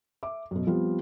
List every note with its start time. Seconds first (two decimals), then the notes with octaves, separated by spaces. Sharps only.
0.23 E5 D6
0.51 F#2 B2
0.67 F3 G3 B3 C4 F4